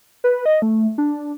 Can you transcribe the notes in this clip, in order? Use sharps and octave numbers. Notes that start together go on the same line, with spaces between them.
B4
D#5
A3
D4